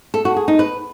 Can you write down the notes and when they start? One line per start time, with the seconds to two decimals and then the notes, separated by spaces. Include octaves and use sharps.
0.14 A4
0.25 F#4
0.36 G#4
0.48 D#4
0.59 B4